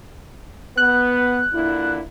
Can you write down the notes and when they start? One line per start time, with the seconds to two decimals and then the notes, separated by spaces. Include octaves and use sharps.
0.77 B3 F#6
1.52 A#2 D3 E4